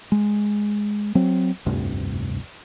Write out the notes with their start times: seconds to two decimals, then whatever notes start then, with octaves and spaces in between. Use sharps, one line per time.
0.12 G#3
1.15 F#3 C4
1.66 F1 D2 G2 C3